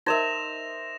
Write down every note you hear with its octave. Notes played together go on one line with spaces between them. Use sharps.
D#4 A#4 C5 D#5 E5 A#6 E7 F7